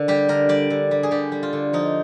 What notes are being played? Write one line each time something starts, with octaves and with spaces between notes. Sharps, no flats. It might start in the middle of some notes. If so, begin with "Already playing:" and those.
Already playing: D3 A#4
G3 G4
D3 A#4
G3 D5
D3
G3
G#4
D3 G4
G3
F4
D3
F3 D#4